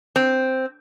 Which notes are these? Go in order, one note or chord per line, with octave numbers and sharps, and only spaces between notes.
C4